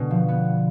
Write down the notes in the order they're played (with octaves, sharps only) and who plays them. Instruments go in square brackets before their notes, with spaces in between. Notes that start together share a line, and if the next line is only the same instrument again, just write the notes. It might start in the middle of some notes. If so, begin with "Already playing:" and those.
Already playing: [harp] B2 D3 G#3
F3
B3